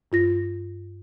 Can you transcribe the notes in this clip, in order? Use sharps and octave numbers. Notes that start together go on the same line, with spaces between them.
G2 F4 A#6